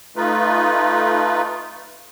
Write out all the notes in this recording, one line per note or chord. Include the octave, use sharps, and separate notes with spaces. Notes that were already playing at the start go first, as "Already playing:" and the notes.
A3 D#4 F4 B4